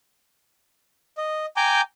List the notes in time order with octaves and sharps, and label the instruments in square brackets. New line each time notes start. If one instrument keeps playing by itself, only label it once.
[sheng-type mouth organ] D#5
G5 G#5 A#5 D6 G6